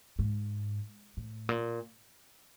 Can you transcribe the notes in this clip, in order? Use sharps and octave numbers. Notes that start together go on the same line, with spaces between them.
G#2
A2
A#2